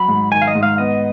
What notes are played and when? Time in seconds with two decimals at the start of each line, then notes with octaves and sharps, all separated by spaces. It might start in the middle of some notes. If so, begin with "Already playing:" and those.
Already playing: F#3 B5
0.08 G#2
0.31 D#3 G#5
0.42 F5
0.47 D#5
0.55 G#2
0.63 F5
0.78 B3 D#5